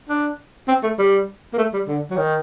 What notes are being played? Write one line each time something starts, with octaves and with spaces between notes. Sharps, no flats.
D4
C4
A3
G3
A#3
A3
G3
D3
F#3
D#3